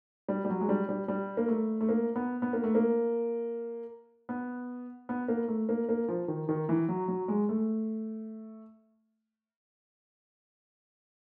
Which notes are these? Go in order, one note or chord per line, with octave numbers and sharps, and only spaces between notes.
G3
G3
F#3
G#3
G3
G3
G3
A#3
A3
A3
A#3
B3
B3
A#3
A3
A#3
B3
B3
A#3
A3
A#3
A#3
F3
D#3
D#3
E3
F#3
F#3
G#3
A3